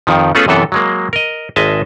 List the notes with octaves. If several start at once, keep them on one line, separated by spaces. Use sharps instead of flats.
F2 D#3 F3
A3 B3 C#4 F4 G#4 A4
F#2 C3 E3 B3 A4
F#3 G#3 A#3
A#4 D#5
G#1 G#3 D#5 E5 A5